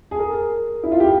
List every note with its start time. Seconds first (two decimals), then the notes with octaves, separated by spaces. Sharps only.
0.11 G#4
0.19 A#4
0.83 E4
0.92 F4
1.00 G4